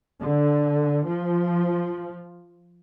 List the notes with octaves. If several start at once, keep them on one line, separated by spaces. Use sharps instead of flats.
D3
F3